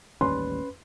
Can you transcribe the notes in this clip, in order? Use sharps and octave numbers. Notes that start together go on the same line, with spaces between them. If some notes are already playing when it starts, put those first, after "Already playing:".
A1 D#2 G3 C#4 B4 C6